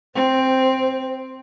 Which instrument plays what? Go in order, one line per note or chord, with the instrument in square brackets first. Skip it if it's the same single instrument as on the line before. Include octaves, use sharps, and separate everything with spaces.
[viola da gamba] C4 [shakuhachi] C5